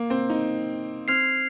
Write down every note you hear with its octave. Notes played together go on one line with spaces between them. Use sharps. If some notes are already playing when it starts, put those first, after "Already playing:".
Already playing: A#3
C4
D#4
C4 F6 G#6 C7 F7